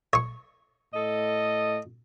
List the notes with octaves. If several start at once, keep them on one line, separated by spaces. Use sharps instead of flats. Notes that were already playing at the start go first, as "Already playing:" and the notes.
C#5 C#6
A2 A4 D#5